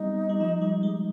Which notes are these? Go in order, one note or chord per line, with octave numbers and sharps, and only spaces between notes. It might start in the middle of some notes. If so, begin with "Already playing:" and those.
Already playing: G3 B3 C4 D#4
G3
F3
G3
G#3